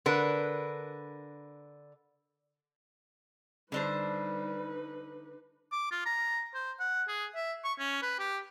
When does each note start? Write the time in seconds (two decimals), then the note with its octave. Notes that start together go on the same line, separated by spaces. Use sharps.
0.06 D3 A#4 B4
3.72 D3 G3 D4 D#4 B4 C5
5.72 D6
5.91 F4
6.06 A#5
6.54 C5
6.79 F#5
7.08 G#4
7.35 E5
7.64 C#6
7.79 C#4
8.02 B4
8.19 G4